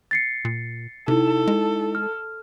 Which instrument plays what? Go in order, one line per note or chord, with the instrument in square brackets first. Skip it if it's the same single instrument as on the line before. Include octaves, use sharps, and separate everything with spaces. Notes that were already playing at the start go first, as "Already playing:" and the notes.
[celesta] A6 C7 C#7
[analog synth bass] A#2
[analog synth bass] C3 [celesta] D#4 E4 [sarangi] A4
[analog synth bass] G#3
[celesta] F6